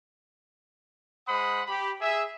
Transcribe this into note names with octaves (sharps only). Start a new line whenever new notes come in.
G#3 C5 F#5 B5 D#6
G4 B5
G#4 E5